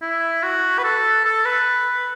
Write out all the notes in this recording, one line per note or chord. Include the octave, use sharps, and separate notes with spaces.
E4
F#4
B4
A4
A4
B4